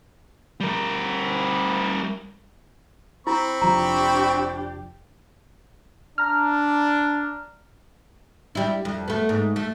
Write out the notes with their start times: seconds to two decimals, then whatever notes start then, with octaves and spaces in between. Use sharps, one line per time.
0.60 G3 A#4
3.27 C4 E4 B5 C#6
3.61 F1 F3 D4 G4 A#5
6.18 D4 A#5 F6
8.55 G3 E4
8.85 F2
9.08 A3 B3
9.29 G#2
9.56 A3